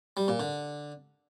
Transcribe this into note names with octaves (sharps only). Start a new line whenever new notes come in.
G3
A#2
D3